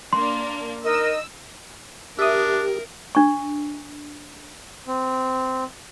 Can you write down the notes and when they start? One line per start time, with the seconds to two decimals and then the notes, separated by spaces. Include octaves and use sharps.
0.13 A#3 D4 C6
0.84 D#4 A#4 D#5 E6
2.19 D4 G4 A#4 E5 D#6
3.15 D4 C#6
4.87 C4